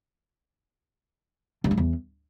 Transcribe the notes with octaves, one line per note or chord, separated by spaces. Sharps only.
G2
G#3
E2